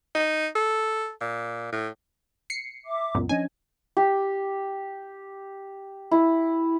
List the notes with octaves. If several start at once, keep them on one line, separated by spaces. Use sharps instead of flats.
D#4
A4
A#2
A2
C7 C#7
E5 D6
C#2 F#2 A#2 B3
F3 C#4 D4 D#5 G#5
G4
E4